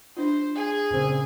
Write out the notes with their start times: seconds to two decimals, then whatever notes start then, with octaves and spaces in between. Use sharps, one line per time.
0.17 D4 F4 C5
0.55 G#4
0.91 A#2 C#3 C4